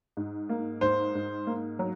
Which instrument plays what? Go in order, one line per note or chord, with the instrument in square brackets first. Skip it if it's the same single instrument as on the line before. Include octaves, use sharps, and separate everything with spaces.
[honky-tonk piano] G#2
A#3
[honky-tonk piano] G#2 [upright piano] C5
[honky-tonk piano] G#2
A#3
F#3